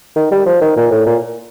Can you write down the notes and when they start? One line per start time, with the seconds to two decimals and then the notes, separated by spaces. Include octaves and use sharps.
0.16 D#3
0.31 G3
0.46 F3
0.61 D#3
0.77 A#2
0.91 A2
1.06 A#2